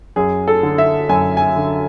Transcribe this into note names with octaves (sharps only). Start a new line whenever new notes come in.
F#2 G#4
A4
D3
E5
F#2 G#5
G#5
D3